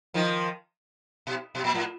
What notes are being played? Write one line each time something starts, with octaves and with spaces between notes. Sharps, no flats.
D#3 F3
B2
B2
A#2
A2